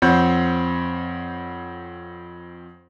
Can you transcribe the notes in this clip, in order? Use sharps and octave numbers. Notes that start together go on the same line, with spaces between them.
F2 C4 C#5 F#5 C6 G6